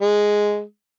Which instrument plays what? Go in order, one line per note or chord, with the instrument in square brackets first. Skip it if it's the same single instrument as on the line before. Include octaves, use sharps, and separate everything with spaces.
[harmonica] G#3